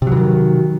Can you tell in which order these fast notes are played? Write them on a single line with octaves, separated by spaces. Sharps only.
C3 F#3 E3 D#3